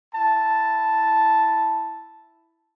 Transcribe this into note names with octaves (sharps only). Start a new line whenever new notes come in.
E4 A5